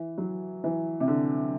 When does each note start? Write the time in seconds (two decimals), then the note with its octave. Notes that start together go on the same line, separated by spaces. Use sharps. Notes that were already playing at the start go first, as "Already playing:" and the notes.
Already playing: E3
0.18 F#3
0.64 E3
1.00 C3
1.08 D3